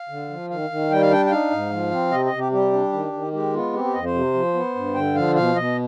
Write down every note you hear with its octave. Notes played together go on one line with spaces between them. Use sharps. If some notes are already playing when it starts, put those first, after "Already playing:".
Already playing: F5
D3
F3
D#3 F5
D#3
G3 G5
F5
D4 G5
G5
D#4 F5
G#2
F3
C4
C3 D#5
D#5
C3
G4
G3 G4
D4
D#3
D#3
G#3 G4
B3 F4
C4 G4
G4
F2 D#5
C5
C3
F3
B3
G2
D3 G5
F3 F5
B2 F5
B2 D#5